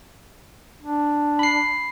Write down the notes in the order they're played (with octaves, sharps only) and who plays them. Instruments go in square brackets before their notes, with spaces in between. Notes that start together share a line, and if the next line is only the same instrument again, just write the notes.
[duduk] D4
[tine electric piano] B5 C7